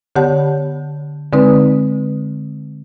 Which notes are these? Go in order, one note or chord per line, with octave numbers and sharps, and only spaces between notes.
D3 B3 G4 C#5 F#5 A5
D3 G#3 C4 D#4 B4